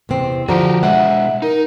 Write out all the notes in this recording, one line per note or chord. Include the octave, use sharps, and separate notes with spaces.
E2 C3 C4
D3 F3 F#4 G4 A#5
B2 G#3 E5 F#5
D#4 A#4